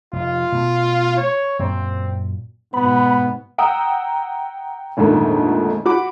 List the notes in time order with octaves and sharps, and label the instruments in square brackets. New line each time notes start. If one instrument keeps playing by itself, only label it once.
[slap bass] F1 [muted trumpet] F4
[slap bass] B2 A3
[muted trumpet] C#5
[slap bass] F#2 A#2 [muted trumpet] C4
[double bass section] G#2 B2 [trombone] B3 [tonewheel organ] B5
[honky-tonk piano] F#5 G5 A#5 D#6 E6
A#1 F2 G#2 D3 D#3 A3
F#4 B5 D6